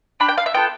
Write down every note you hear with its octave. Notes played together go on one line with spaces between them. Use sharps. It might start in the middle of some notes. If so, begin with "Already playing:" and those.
D4 G4 B5
G5
F5
E5
B3 F4 A4 G5